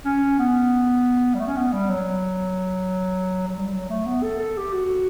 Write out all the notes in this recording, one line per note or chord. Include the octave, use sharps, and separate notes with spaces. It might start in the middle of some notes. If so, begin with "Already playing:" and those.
C#4
B3
G3
A3
C#4
B3
G3
F#3
F#3
G3
F#3
A3
B3
A4
A4
G4
F#4